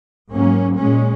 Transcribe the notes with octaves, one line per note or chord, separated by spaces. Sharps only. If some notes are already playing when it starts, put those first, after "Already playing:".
G#2 F#3 A#3 C#4
A#2 G#3 C#4